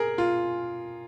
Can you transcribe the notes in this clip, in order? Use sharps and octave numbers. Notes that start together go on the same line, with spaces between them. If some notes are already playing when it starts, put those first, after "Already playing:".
Already playing: G#4 A#4
F4